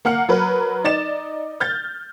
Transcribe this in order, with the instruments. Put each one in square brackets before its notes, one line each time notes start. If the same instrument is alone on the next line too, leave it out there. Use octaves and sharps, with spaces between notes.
[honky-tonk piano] A#3 F#5 F6 C#7
F#3 A#4 B4
D#4 D5 A6 E7
F6 G6 A6